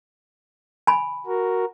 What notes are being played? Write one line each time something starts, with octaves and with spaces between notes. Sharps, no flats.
G#5 B5
F#4 A#4